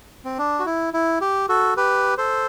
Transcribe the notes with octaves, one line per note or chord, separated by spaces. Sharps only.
C4
D4
F#4
E4
E4
G4
F#4 A4
G4 B4
A4 C5